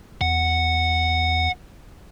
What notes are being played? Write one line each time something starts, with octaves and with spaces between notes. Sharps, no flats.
E2 F#5